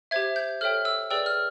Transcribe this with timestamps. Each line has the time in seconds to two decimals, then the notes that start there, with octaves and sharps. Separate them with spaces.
0.11 G4 C5 E5 G#6
0.36 G6
0.61 A4 C#5 E5 G5 F6
0.85 E6
1.10 G#4 B4 D5 G5 E6
1.26 F6